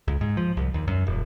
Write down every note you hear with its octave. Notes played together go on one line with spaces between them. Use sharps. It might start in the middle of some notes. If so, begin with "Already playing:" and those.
C#2
G#2
F3
C2
D#2
F#2
D#1